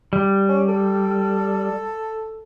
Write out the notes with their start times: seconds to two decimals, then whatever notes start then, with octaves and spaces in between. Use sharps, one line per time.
0.13 G3
0.49 C#4
0.68 A4